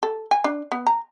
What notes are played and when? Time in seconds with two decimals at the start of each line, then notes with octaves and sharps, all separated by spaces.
0.03 A4
0.31 G#5
0.44 D4
0.72 B3
0.87 A#5